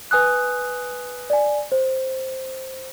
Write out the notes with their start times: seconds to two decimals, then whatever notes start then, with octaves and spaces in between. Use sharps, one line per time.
0.11 B4 G#5 D#6 F#6
1.30 D5 G#5
1.72 C5